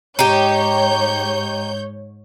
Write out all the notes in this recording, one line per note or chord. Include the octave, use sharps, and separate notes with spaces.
G#2 D#4 G4 C#5 G6